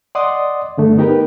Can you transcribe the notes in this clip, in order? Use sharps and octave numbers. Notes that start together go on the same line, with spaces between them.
D5 D#5 F#5 C6 D6 D#6
G2 D3 A3
B3 D#4 G4 A#4 B4